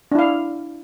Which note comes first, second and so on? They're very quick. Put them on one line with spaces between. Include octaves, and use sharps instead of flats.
D4 E4 F5